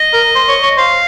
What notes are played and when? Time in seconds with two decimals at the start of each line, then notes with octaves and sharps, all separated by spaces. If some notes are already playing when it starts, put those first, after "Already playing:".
Already playing: D#5
0.14 A#4
0.36 C5
0.49 C#5
0.63 C#5
0.78 C5 F5